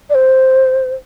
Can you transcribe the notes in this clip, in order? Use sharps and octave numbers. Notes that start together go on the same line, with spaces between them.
D5
C5